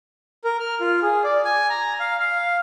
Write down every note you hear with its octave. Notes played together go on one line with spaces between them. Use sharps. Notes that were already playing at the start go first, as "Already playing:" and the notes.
A#4
F6
F4
G#4
D5
G#5
A#5
F5
F5